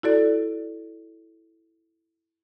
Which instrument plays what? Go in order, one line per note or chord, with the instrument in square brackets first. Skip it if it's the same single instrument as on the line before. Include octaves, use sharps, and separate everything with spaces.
[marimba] E4 F#4 A4 D5